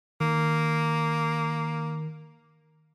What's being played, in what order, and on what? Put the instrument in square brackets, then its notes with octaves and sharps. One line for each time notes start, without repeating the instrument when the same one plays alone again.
[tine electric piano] D#3 [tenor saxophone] A#3